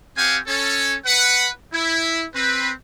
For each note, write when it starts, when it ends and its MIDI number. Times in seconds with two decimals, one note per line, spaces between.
0.17 0.37 60
0.17 0.37 67
0.17 0.37 72
0.17 0.37 77
0.17 0.37 78
0.17 0.37 80
0.47 0.95 61
0.47 0.95 69
0.47 0.95 73
1.04 1.47 71
1.04 1.47 78
1.73 2.23 64
2.34 2.70 60
2.34 2.70 71